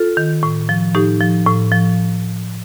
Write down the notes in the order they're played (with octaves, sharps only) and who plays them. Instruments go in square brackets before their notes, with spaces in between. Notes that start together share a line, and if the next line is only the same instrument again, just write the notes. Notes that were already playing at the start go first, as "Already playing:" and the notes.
Already playing: [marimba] F4 A4
D#3
A2
F3
A2 D#4 G4
F3
A2
F3